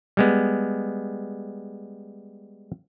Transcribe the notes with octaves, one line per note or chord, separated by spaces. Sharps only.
G3 G#3 B3